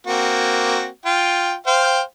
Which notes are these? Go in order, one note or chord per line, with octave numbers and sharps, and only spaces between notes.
A#3 C4 F#4
F4 G5
C5 F5 G5